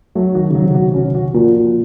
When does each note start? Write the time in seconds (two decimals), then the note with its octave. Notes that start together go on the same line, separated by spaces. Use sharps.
0.15 F#3 A3
0.35 D#3 F#4
0.51 C#3 F#3
0.62 C3
0.75 B2 F#4
0.94 C#4
1.15 F#4
1.34 A#2 F3
1.54 F3